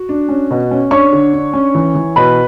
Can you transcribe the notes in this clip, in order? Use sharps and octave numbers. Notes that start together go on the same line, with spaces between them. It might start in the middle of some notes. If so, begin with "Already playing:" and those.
Already playing: F#4
D4
C#4
B2
C#4
D4 C#5 C#6
D3
D4
C#4
E3
E3
B2 B4 B5